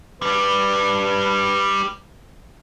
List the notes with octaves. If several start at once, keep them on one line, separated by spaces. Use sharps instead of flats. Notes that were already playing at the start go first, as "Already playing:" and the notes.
G3 D4 B4